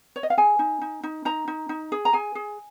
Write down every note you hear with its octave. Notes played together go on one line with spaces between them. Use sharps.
C#5
D#5
F5
G#4 G#5
D#4
D#4
D#4
D#4 A#5
D#4
D#4
G#4
A#5
G#4 G#5
G#4